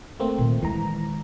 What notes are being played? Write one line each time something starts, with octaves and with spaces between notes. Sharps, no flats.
A3 A#3 C4
A#2 D#3
D#3 E3 G#3 A#5